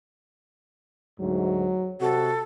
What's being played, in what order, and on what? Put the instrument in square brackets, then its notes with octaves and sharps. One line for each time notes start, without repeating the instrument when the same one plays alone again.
[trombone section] D2 G#2 [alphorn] F#3
[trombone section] C3 F#4 [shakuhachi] A4